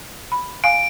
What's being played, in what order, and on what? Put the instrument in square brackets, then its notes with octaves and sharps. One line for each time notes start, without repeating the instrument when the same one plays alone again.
[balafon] B5
[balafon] F5 G#5 [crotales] D7